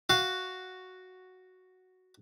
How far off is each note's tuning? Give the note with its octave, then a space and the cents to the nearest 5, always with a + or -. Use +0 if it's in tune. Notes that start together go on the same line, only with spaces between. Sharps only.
F#4 +0 F5 +0